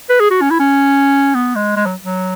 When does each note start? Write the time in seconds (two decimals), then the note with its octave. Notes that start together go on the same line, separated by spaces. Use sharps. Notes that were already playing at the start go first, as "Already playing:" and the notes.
0.10 B4
0.20 G#4
0.31 F#4
0.41 C#4
0.50 E4
0.60 C#4
1.35 B3
1.55 G#3
1.76 G#3
1.86 F#3
2.04 F#3